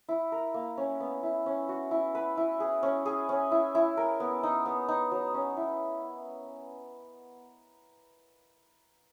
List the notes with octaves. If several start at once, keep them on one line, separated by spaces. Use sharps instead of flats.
E4
A#4
A#3
C#4
B3
E4
C#4
F#4
E4
B4
E4
G#4
C#4
G#4
C#4
E4
E4
A#4
B3
D#4
B3
D#4
F#3
C#4
E4